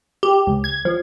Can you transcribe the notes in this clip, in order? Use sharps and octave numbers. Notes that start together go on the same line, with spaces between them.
G4
C#2
G#6
F3